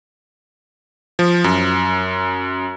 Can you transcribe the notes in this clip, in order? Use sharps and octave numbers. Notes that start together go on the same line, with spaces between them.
F3
F#2